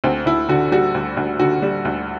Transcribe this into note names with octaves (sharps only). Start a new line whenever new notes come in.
D2 C4
D2 E4
D3 F#4
G3 F#4
D2
D2
D3 F#4
G3
D2